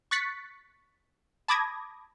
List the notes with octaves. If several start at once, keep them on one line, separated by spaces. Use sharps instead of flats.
C#6 F#6 A6 B6 C#7
A5 B5 D6 D#6 G#6 A#6